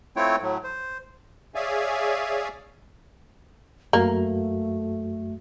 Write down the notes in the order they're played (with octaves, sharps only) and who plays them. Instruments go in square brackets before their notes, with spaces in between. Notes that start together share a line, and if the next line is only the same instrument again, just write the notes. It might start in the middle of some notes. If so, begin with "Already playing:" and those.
[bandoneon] A3 C4 E4 F4 C#5 G5
A2 F#3
C5
[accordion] G#4 C#5 D5 E5 F5 G#5
[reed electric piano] F#2 F#4 [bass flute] A3 [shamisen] A#3